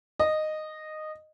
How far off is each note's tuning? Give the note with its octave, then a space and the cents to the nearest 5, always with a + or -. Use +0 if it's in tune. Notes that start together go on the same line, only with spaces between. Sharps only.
D#5 -10